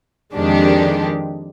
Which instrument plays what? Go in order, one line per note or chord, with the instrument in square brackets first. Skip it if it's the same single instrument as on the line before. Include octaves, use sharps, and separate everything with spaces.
[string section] F2 D#3 G#3 D4 G4